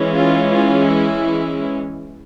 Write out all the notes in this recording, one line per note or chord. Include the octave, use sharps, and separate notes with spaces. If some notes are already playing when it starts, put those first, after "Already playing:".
Already playing: E3 G#3 C#4
F4
F4
E4